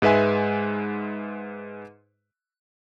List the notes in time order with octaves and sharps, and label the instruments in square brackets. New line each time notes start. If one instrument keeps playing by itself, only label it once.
[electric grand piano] G#2 G#3 B4 E5 G#5